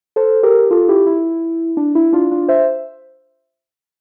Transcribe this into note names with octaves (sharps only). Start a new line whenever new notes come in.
A4 C5
G4 A#4
F4 A4
E4 G4
E4
D4
E4
D4 F4
D4 F4
C5 E5